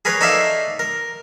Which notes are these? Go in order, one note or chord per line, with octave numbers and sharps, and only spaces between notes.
G#4 A#4 B4 C#5
D#4 A4 C#5 D5 E5 F5
A#4